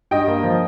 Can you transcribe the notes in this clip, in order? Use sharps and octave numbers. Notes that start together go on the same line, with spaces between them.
G2 D#5 G5
A#3
F3